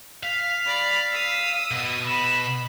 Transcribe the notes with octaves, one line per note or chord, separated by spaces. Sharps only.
F5 B6
D5 B5
D#6 E6
B2
B5 E7